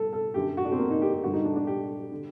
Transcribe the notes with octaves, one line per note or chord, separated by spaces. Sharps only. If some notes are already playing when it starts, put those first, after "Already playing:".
Already playing: G2 A4
A4
F#2 D3 G4
F#4
D4
C4
A#3
D#4
G4
G4
G2 D3 F#4
D#4
D4
D4
G4
D3